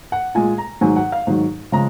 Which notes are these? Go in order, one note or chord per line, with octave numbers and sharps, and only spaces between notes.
F#5
A#2 G#3 G#5
A#5
G#2 D#3 F#3 G#5
F#5
F5
G#2 D#3 F#3
C#3 F3 G#3 A#5